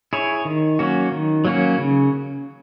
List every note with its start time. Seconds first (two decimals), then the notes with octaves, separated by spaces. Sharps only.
0.13 E4 G#4 C#5
0.45 D#3
0.79 F#3 A#3 C#4 F#4
1.12 D#3
1.45 F#3 A#3 C#4 F#4
1.78 C#3